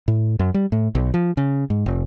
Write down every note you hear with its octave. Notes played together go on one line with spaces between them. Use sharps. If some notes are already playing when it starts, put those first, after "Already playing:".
A2
F#2
G3
A2
B1
F3
C#3
G#2
F1